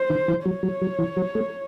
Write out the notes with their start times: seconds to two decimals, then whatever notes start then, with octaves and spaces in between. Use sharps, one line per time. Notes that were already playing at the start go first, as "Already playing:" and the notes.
Already playing: C5
0.10 D#3
0.28 E3
0.45 F#3 C#5
0.63 F#3
0.82 F#3
0.99 E3
1.17 F#3
1.35 A3